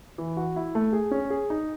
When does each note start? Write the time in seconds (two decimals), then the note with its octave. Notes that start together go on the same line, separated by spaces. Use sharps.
0.18 E3
0.37 F#4
0.56 E4
0.75 A3
0.93 G#4
1.11 C#4
1.30 G#4
1.50 D#4